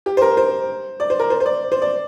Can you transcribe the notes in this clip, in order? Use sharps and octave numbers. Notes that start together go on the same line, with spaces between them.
G4
C5
A#4
C5
D5
C5
A#4
C5
C5
D5
C5
D5